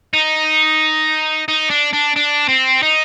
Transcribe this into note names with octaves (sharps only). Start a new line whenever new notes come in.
D#4
D#4
D4
D4
D4
C4
D#4